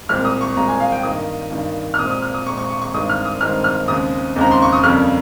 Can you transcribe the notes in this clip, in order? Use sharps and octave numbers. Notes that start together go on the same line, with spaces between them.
C2 A#2 G#3 C4 F6
D#6
C#6
C2 A#2 G#3 C4 A#5
G#5
F5
G5
G2 D#3 A#3 D#6
G2 D#3 A#3
F6
A#2 G#3 C4 D#6
D#6
F6
D#6
A#2 G#3 C4 C#6
C#6
C#6
C#6
G2 D#3 G#3 C4 D#6
F6
D#6
G2 D#3 G#3 C4 F6
F6
D#2 C#3 G#3 C4 D#6
D#2 C#3 G#3 C4 A#5
C6
C#6
D#6
F2 C#3 G3 A#3 C#4 F6